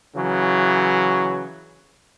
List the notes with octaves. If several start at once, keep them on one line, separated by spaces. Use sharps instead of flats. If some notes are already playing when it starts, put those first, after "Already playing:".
C#3 E3 F#3